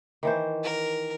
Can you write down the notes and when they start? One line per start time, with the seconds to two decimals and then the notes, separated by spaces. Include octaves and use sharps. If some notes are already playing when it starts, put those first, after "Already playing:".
0.23 D#3 E3 C5
0.63 A#4